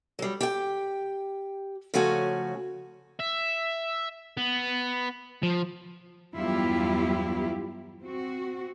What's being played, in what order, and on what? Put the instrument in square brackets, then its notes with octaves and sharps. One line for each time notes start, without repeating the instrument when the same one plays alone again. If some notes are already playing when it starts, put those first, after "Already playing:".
[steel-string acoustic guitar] F#3 G3
G4 G5
C#3 F3 A3 C#4 F#4 G#5
[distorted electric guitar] E5
B3
F3
[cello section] E2 G2 F#3 E4 F4 G4
C4 F#4